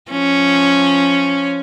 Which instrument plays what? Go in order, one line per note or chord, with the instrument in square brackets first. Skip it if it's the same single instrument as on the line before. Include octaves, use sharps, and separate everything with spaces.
[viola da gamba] F3 C#4